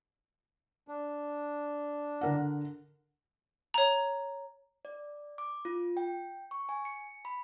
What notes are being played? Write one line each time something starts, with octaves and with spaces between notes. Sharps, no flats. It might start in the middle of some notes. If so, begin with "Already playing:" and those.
D4
D3 A#4 F#5
C#5 A#5
D5
D6
F4
G5
C#6
G#5
C#7
B5